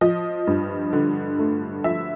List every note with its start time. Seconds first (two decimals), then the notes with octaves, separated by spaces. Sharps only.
0.01 F3 D#5
0.47 G2
0.93 D3
1.39 A3
1.84 F3 E5